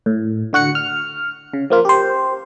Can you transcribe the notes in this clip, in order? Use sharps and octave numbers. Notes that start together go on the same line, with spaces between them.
A2
D3 F#4 F#5 C#7
F6
C#3
F3 A#3 F4
G4 C5